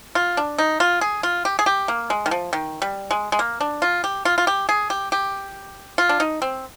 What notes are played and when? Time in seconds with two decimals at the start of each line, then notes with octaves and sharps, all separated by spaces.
0.15 F4
0.37 D4
0.58 D#4
0.80 F4
1.01 G#4
1.23 F4
1.45 G4
1.59 G#4
1.66 G4
1.88 A#3
2.10 G#3
2.26 D#3
2.31 F3
2.53 D#3
2.82 G3
3.11 G#3
3.32 G#3
3.39 A#3
3.61 D4
3.82 F4
4.04 G4
4.25 F4
4.38 F4
4.47 G4
4.69 G#4
4.90 G4
5.12 G4
5.98 F4
6.09 D4
6.20 D#4
6.42 C4